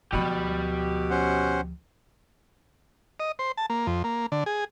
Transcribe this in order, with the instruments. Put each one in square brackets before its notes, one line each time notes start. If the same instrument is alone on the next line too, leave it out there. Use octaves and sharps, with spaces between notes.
[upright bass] D2 F3 [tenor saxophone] B2 [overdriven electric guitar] G4 B5
[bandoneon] C#4 C5 F#5
[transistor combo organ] D#5
C5
A5
A#3
F2
A#3
D3
G#4